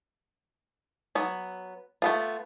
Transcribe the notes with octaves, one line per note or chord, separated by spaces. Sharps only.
F#3 B3
A3 B3 F4